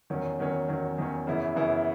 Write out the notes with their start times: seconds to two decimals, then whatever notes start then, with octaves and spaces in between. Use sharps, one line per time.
0.10 E2 D#3 F#3 C#4
0.39 E2 D#3 F#3 C#4
0.68 E2 D#3 F#3 C#4
0.98 E2 D#3 F#3 C#4
1.27 F#2 C#3 E3 B3 E4
1.56 F#2 C#3 E3 B3 E4